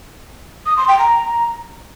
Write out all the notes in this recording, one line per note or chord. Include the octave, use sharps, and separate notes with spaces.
D#6
C6
G5
A#5